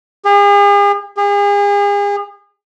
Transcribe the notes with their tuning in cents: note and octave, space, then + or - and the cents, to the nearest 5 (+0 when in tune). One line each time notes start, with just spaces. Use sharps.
G#4 -45
G#4 -40